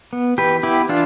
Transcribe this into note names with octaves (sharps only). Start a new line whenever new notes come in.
B3
E3 G4 B4
B3 E4 G4
E3 D4 F4